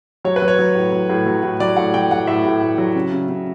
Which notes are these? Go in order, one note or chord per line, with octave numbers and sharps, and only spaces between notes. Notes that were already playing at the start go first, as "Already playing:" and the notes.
F#3 C#5
B4
F#3
C#5
F#3
A2
F#3
A2
F#3
A2
F#3 D5
A2 F#5
F#3 G5
F#3 F#5
A2 E5
A2
A2
F#3
C#3
C#3
C#3